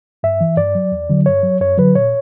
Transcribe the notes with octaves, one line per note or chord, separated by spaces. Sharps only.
G2 E5
E3
G2 D5
F#3
E2
D3 F#3
G2 C#5
F#3
F#2 C#5
D3 F#3 B4
A#2 C#5